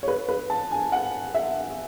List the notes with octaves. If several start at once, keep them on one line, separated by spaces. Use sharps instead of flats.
C#5
B4
B4
A5
G#5
F#5
E5